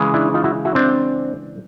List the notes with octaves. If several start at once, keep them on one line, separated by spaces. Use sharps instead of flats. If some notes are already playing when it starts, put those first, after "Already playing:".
Already playing: C#3 E3 G#3
D4 E4
D#4 F4
E4 F#4
E4 F#4
C4 D4